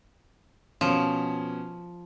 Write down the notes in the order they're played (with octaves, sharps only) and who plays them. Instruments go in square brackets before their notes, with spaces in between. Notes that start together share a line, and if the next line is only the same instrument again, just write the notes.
[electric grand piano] B2 C#4 [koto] F3